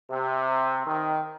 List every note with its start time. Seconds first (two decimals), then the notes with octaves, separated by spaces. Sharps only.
0.10 C3
0.87 D#3